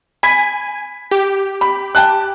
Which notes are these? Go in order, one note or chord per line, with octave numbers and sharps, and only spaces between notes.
G#5 B5 B6
G4
B5
G5 A5 F#6